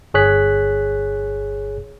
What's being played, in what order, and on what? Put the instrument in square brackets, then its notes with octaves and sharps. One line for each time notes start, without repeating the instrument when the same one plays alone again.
[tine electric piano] G1 G#4 C#5 F#6 B6